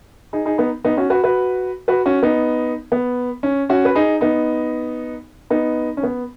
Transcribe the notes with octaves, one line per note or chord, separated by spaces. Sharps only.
D#4 G#4
D#4 G#4
B3 D#4
B3 D#4
C#4 F#4
F#4 B4
F#4 B4
F#4 B4
C#4 F#4
B3 D#4
B3
C#4
C#4 F#4
B4
D#4 G#4
B3 D#4
B3 D#4
C#4
B3